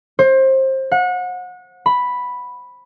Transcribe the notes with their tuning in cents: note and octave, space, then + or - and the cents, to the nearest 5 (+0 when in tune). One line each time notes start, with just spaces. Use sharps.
C5 +25
F#5 -30
B5 +0